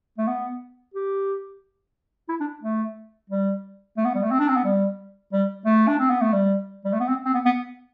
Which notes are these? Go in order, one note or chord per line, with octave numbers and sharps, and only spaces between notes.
A3
B3
G4
E4
D4
A3
G3
A3
B3
G3
A3
C4
D4
C4
B3
G3
G3
A3
D4
C4
B3
A3
G3
G3
A3
B3
C4
C4
B3
B3